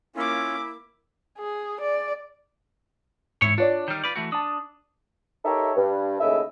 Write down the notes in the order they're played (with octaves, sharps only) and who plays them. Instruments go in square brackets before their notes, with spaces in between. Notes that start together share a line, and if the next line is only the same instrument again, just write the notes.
[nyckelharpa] A#3 D6 [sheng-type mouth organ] C#4 F4 [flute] E4
[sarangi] G#4
D5
[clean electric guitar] E2 E4 C#5 [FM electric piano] G#2
[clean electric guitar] D4 [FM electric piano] F4 C#5 D5
[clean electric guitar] D#3 G3 [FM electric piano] F6 G6
[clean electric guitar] F4 B4 D5
E3 A3 F#4
[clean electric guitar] D4 [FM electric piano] A5 D#6
[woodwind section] D#4 G4 A4 A#4 C#5 E5
G2
D#2 C#3 A3 E4 D#5 E5